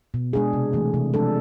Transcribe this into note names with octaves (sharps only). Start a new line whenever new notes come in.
B2
G#3 D4 G#4
C3
E3 A3
C3
F3 G#3 D4 A4